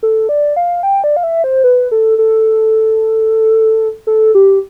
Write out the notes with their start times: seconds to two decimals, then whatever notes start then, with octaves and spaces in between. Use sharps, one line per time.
0.03 A4
0.29 D5
0.56 F5
0.83 G5
1.04 D5
1.16 F5
1.23 E5
1.44 C5
1.64 B4
1.91 A4
2.18 A4
4.07 A4
4.35 G4